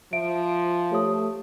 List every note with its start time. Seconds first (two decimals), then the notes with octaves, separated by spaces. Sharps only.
0.13 F3 E5 D7
0.92 A3 G4 C#5 D#6